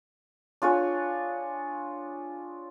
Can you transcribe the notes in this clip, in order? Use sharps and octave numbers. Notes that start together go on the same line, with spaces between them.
D4 F4 G#4 C#5